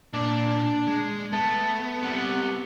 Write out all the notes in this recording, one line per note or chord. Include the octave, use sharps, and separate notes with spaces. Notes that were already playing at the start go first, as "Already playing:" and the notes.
A#2 D4 D5
G#3
A3 B3 A5
C3 G3 F#5